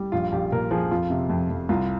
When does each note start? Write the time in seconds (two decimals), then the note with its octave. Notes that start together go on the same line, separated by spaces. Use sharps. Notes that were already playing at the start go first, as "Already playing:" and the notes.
Already playing: G3
0.12 A#1 F4
0.32 A#1 G4
0.52 A#2 A#4
0.71 F3 G#4
0.91 F2 F4
1.10 C3
1.29 F2
1.50 F2
1.69 C2 F4